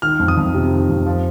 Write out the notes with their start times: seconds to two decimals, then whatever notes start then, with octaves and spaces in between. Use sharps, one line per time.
0.02 D#3 F6
0.19 F2
0.28 D#6
0.37 F2
0.54 C3
0.72 D#3
0.89 F2
1.06 F3